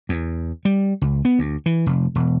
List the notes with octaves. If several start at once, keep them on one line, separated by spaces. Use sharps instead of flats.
E2
G3
C#2
B3
D2
E3
F1
E1